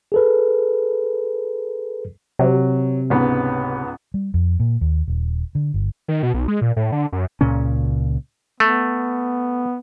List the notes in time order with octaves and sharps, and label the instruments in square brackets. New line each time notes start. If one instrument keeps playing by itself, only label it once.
[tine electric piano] G#4 A4 B4
[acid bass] C3 [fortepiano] F#3
[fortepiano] C#2 G#2 B3
[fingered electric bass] G3
F2
A#2
D#2
D#1
D3
G1
[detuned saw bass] D#3
B2
B1
G#3
A#2
A2
D3
F#2
[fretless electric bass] C#2 A#2 C#3 C#4
[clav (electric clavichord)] A3 [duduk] B3